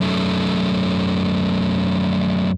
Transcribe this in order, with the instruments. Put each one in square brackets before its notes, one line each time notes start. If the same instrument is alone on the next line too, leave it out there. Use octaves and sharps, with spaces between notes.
[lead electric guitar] F#2 A3